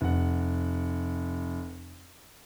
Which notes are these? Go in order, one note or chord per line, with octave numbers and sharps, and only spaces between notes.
F1 F#5